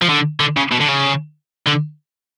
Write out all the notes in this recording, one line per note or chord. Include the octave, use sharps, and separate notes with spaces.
F3
D3
D3
C#3
B2
D3
C#3
D3